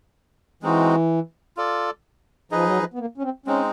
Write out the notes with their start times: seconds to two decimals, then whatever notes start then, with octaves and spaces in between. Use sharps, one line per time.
0.62 E3 G#3 C4 D#4 F#4
1.57 F4 A4 D5
2.51 F3 D#4 G#4 B4 D#5
2.65 F#3
2.78 F3
2.94 B3
2.99 A#3
3.18 C#4
3.23 C4
3.46 G#3 C4 C#4 D#4